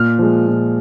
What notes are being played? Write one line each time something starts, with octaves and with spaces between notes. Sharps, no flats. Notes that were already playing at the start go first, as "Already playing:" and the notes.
Already playing: A#2 F6
F3 G#3
A#2